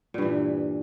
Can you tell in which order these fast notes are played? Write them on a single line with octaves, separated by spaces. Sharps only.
A#2 G2 E3